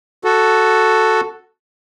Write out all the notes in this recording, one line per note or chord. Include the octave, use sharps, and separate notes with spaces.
F#4 A4